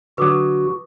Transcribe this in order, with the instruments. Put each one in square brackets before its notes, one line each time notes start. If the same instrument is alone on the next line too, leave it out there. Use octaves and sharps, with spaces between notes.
[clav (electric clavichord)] D3 F#3 [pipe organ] F#4 [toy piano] B4 D6 D#6